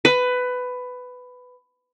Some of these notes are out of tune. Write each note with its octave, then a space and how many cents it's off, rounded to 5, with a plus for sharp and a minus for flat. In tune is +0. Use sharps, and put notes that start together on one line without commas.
B4 +15